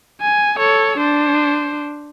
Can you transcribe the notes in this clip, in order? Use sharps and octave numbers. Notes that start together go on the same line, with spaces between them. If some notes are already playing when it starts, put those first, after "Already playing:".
G#5
A4 C#5
D4 C5